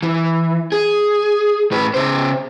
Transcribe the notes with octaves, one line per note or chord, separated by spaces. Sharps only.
E3
G#4
A2 B4
C#3 C5